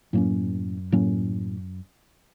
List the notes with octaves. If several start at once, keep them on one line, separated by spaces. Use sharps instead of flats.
F#2 A2 F#3 A#3 C#4
A2 F#3 A#3 C#4